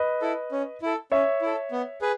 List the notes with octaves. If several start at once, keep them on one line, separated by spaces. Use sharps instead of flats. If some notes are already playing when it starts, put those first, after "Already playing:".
Already playing: B4 D#5
E4 A4
C#4
E4 A4
C#4 C#5 E5
E4 A4
B3
G#4 B4